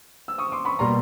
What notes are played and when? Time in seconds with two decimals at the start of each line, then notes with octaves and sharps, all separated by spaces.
0.28 E6
0.38 C#6 D#6
0.52 C6 D6
0.65 B5 C#6
0.79 B2 G3 A#3 A#5 C6